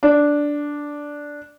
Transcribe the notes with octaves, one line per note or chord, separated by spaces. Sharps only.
D4